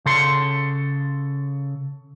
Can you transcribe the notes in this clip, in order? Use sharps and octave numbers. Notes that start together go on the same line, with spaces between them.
C#3 A4 C6